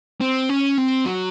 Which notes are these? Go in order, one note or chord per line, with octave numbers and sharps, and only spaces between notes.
C4
C#4
C4
F#3